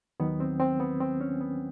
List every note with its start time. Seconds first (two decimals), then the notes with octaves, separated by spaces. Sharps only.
0.20 D#2 D#3 F#3 B3
0.40 C4
0.59 C4
0.80 B3
1.01 C4
1.21 C#4
1.41 B3